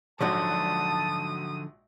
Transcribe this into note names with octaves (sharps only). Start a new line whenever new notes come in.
A#1 G#2 D3 F3 F#3 F#4 A5 D#6